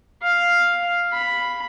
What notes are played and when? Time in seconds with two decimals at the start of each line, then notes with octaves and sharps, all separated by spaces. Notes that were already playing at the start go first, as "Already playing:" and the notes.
0.23 F5
1.13 B5